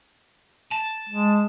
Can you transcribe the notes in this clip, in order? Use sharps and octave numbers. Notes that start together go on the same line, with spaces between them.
A5
G#3